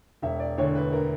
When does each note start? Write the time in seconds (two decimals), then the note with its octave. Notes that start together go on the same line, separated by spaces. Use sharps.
0.22 E1 E5
0.40 D5
0.58 D2 D3 C#5
0.75 B4
0.93 A#4